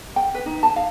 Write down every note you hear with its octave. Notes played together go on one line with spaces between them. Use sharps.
G5
B4
D#4
A5
F5